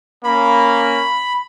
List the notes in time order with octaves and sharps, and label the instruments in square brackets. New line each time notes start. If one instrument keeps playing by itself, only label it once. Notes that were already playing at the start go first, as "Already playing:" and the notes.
[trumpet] A#3 [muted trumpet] C#4 [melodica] B5